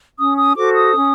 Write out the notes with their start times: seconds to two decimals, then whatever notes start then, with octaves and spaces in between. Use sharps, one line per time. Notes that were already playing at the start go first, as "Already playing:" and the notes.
0.19 C#4 D#6
0.38 D#6
0.56 F#4 A4 C5 D6
0.75 D#6
0.94 C#4